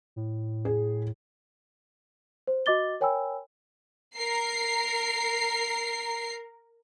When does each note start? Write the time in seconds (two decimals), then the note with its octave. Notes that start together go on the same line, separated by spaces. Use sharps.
0.16 A2
0.65 G#4
2.47 C5
2.66 F#4 D#5 D6 A6 G7
3.01 A#4 C#5 G5 G#5 B5 E6
4.17 A#4 C7